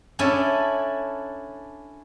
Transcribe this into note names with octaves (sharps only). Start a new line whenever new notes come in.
C#4 D4 E4 A4 G#5